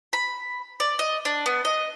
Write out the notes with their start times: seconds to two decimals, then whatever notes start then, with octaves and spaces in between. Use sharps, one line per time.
0.13 B5
0.80 D5
0.99 D#5
1.25 D4
1.46 B3
1.65 D#5